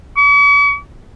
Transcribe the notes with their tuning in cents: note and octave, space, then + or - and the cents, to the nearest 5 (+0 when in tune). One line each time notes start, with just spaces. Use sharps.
C#6 +45